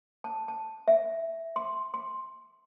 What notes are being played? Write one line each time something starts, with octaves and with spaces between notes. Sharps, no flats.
A5
A5
E5
C6
C6